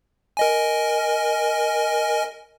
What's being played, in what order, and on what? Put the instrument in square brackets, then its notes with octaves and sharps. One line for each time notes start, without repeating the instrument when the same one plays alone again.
[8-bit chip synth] A#4 D#5 G#5